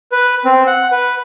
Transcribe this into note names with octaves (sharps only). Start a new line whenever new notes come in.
B4
C4
F#5
B4